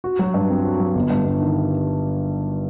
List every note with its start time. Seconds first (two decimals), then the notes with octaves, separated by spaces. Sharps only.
0.04 F#4
0.19 F#3
0.34 G2
0.50 C4
0.64 F#4
0.80 F#3
0.95 G1
1.10 G2
1.26 G1
1.41 D#3